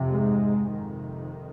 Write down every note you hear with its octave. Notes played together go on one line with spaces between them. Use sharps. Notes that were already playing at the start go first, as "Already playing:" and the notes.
Already playing: F2 C3
G#2 G#3
F2 C3 D#3